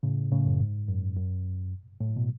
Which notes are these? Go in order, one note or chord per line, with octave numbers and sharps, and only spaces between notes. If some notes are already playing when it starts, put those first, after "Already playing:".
A2 C#3
A2 C#3
F#2
G#2
F#2
F#2
A2
B2